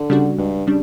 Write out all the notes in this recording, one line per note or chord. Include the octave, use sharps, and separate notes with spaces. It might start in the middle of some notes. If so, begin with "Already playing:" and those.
Already playing: D3
C#3 G3 D4 F#4
C#2 G2
C#3 G3 D4